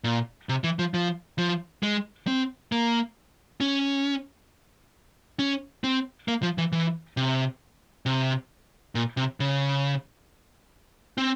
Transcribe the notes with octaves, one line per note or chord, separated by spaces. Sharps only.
A#2
C3
E3
F3
F3
F3
G#3
C4
A#3
C#4
C#4
C4
A#3
F3
E3
E3
C3
C3
A#2
C3
C#3
C4